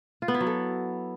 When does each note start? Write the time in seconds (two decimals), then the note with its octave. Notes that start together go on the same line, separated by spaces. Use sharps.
0.22 F4
0.28 B3
0.34 E4
0.40 F#3
0.47 A4